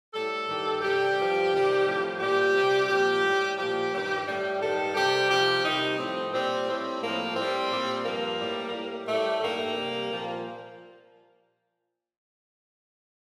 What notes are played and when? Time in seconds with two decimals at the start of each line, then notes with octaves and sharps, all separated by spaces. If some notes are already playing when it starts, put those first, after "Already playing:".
0.14 A2 G3 A4
0.47 G2 D#3 G3
0.82 C3 G3 G4
1.17 G2 F3
1.51 C3 D#3 G3
1.85 A2 F3
2.19 A#2 G3 G4
2.55 C3 G3
2.88 A#2 F3 G4
3.23 A2 G3
3.57 A#2 F3 G4
3.92 G2 D#3 G3
4.26 A2 G3
4.60 G2 D#3 G3 A4
4.94 C3 G3 G4
5.29 C3 F3 G4
5.63 C3 D#3 G3 D#4
5.98 A2 F3 C4
6.32 A#2 G3 C4
6.67 A2 G3 C4
7.01 A2 F3 A#3
7.35 A2 G3 C4
7.69 A#2 G3
8.04 G2 F3 A#3
8.39 A2 G3
8.72 A2 G3
9.07 A2 G3 A3
9.41 G2 D#3 G3 A#3
9.75 C3 G3
10.10 A#2 F3